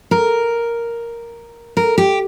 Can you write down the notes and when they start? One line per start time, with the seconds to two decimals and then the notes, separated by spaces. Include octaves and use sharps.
0.11 A#4
1.77 A#4
1.98 G4